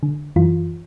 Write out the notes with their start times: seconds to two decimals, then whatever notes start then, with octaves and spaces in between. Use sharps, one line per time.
0.03 D3
0.36 F#2 E3 F4